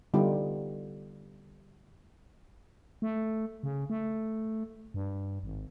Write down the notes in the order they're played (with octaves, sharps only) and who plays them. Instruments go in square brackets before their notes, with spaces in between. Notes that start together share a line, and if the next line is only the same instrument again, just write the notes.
[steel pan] D3 G3 B3 D#4 F4 G4
[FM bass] A3
C#3
A3
G2
G#1